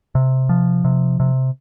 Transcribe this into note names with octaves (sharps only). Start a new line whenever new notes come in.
C3
F3
C3
C3